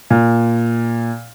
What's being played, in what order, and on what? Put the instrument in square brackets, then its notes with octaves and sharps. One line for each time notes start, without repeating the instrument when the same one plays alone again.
[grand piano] A#2